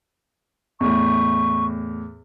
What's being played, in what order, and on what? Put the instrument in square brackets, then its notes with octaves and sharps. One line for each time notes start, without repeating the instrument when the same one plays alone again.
[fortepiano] E2 A2 [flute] C#6